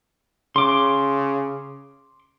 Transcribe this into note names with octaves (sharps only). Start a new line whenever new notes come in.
C#3 C6 D6